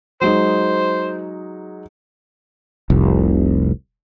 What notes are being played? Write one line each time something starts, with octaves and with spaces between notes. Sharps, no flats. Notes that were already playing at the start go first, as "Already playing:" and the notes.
F#3 G#3 D#4 C5
F1 C2